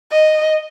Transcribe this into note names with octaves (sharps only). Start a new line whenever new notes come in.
D#5